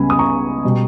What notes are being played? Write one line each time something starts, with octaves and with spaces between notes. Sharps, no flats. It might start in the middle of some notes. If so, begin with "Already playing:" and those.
Already playing: C#2 C#3 G3 B3 G#5 B5
D#6
A#5 C#6
B2 G3